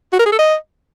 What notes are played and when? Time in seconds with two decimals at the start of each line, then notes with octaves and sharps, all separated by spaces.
0.13 F#4
0.19 A#4
0.26 G#4
0.32 A4
0.39 D#5